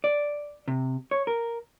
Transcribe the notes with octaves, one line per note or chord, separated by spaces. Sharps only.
D5
C3
C#5
A#4